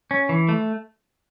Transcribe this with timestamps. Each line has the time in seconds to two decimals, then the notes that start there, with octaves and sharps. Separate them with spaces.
0.11 C#4
0.29 E3
0.49 A3